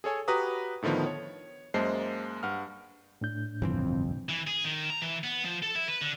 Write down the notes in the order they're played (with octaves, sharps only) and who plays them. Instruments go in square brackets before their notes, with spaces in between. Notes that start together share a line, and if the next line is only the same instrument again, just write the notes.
[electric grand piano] G#4 A4 C#5 G#5
F#4 G4 B4 A#5 B5 D#6
A2 D3 D#3 F3 B3
C#5
F#2 G#3 A#3 C5 A5 C7
G2 F#5 F6
[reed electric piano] A2 D4 G6
[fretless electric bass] G1 C2 F2 [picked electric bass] C#3 E3 C4
[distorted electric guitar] E3
G#4
D#3
A#5
E3
B3
F3
A4
E4
B4
D3